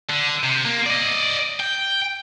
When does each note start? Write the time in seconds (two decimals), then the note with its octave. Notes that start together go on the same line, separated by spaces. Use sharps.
0.10 D3
0.43 C3
0.65 A#3
0.86 D5 D#5
1.60 G5